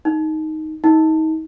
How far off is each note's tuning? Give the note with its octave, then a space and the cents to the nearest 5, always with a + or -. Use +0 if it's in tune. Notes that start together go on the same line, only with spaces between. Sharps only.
D#4 +5
D#4 +30